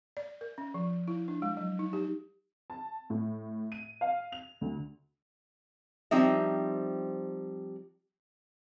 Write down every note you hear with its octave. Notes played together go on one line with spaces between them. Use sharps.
D5
A#4
C#4
F3
E4
D4
G#3
F#3
D#4
G4
A5
A2
D#7
F5
F7
D2
F3 G3 C4 D#4 E5